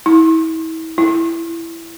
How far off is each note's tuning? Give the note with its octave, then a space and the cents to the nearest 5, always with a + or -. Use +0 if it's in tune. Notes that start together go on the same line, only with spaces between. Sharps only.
E4 -35
E4 +15